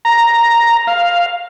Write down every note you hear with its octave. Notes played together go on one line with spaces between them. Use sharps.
A#5
F5